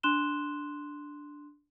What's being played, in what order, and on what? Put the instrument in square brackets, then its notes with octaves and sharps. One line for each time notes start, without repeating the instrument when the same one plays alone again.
[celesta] D4 C6 F#6 E7 G7